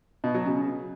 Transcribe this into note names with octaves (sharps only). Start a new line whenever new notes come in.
B2
F#3
C#3